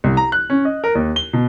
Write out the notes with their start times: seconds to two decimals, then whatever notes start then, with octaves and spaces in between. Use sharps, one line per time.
0.04 C2
0.17 A#5
0.32 F#6
0.50 C#4
0.65 D#5
0.84 A#4
0.95 D#2
1.16 G7
1.33 B2